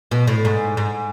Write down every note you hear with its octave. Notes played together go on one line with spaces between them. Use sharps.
B2
A2
G#2
G#2